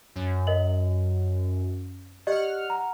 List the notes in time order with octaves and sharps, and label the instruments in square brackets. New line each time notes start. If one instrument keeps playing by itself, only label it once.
[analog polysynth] F#2
[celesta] A#4 D#5 F#7
[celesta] G4 D5 D#5 [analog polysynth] F#5 F6
[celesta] A#5